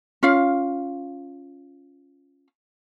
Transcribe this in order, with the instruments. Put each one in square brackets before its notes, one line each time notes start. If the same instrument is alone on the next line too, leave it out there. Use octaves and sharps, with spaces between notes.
[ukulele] C#4 F4 F5